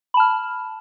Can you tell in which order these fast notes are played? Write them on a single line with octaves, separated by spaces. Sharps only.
B5 A5 F6